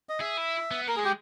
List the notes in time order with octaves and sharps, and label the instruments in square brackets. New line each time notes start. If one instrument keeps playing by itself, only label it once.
[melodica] D#5
[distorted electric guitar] G#4 [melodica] E5
[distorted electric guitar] E4
B3
[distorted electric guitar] A#3 [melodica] A#4
[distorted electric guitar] G#3 [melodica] G#4
[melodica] G4